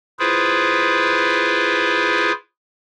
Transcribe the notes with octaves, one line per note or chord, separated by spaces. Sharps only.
E4 F4 G#4 B4 C5